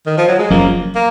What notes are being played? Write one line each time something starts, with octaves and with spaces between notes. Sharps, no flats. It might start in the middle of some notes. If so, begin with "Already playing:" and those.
D#3
F3
F#3
G#3
F#1 F#2 F3 A#3
A#3